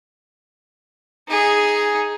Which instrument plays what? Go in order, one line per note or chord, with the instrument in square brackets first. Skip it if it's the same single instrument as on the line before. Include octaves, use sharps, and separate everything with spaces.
[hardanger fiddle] D#4 G#4